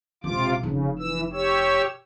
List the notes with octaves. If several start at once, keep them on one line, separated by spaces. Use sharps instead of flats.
E1 C3 F4 D6
F1 C#3
E3 E6
G4 C#5 E6